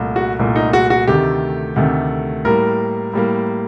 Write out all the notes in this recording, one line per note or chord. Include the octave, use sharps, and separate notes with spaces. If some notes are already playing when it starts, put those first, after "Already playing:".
Already playing: C2 A#2 A3
F#4
C2 A#2 A3
D#4
F#4
F#4
D2 C3 D#3 A3 G4
D2 C3 D#3 A3
A2 G3 A#3 A#4
A2 G3 A#3